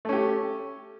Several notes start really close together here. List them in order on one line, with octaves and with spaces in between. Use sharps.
A3 C#4 G4